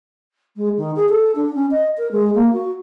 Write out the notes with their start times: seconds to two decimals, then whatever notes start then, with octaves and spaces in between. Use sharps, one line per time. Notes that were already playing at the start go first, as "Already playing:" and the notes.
0.56 G#3
0.77 D#3
0.95 G#4
1.08 A4
1.35 D4
1.54 C#4
1.70 D#5
1.97 A#4
2.11 G#3
2.34 A#3
2.52 F#4